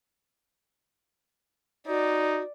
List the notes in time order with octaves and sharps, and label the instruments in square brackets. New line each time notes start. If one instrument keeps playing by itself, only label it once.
[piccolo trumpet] D#4 [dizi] F#4 [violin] D5